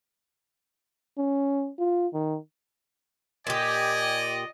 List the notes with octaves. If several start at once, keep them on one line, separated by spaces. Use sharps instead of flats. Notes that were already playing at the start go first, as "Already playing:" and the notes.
C#4
F4
D#3
A#2 G4 D5 D#5 G#5